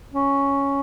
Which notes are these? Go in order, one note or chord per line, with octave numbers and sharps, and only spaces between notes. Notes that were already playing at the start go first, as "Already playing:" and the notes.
C#4